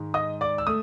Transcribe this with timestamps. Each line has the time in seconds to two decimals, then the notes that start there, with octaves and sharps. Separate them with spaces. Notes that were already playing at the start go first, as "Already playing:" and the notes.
Already playing: G#2 D#3 G#3
0.14 D#5 D#6
0.41 D5 D6
0.58 E6
0.67 A3 D#6